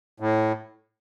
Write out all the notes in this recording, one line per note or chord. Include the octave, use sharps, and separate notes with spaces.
A2